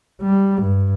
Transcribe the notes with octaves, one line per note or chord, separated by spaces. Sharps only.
G3
G2